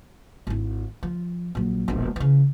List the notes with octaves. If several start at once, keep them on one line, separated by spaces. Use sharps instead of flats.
G#1 E4
F3
A#1 F#3
E1 A#1
C#3 E3